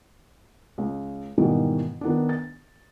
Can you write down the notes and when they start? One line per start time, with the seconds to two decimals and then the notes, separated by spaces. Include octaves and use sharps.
0.78 C#2
1.38 G#2 B2 D#3 E3 G3
2.01 D#3 B3 D4
2.29 A6